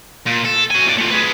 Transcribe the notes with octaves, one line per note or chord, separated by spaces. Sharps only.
A#2
A4
F#4 G#5
A2 D5
A3 F4
G#4 B4